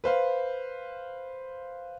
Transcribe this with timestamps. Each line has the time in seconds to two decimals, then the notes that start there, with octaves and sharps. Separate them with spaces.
0.04 B4 C5 F5